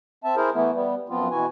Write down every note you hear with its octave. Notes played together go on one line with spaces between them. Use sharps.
C4 E5 A5
E4 G#4 A#4 C5
E3 A3 B3 E4
G3 B3
F#2 F3 B3 C4 F4
B2 E3 E4 F#4 G#5